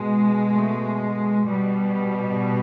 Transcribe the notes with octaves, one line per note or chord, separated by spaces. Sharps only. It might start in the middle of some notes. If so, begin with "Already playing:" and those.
Already playing: B2 G#3
A3
B2 G3